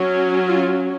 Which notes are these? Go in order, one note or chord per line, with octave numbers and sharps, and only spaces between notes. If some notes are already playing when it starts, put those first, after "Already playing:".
Already playing: F#3 C#4
F4